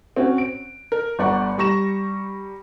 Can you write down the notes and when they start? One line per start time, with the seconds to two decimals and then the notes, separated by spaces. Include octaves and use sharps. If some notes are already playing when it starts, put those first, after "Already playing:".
0.16 C4 C#4 F#4
0.38 D7
0.92 A#4
1.19 G1 D5 F#5 A#5 C#6
1.58 G3 A#5 C#6 A#6 E7